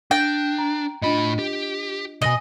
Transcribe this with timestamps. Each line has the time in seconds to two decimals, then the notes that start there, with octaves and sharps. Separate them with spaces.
0.11 D4 G5 A#6
0.58 A#5
1.02 A2 D4 F4 D#5 B5
1.39 G4
2.22 C2 B2 D#5 G#5 A#6 F#7